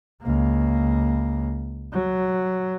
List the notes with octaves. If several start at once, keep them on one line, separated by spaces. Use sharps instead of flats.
C#2 A#3
F#3